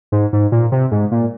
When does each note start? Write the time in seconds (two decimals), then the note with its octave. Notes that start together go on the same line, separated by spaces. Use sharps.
0.12 G#2
0.33 G#2
0.52 A#2
0.72 C3
0.91 G#2
1.12 A#2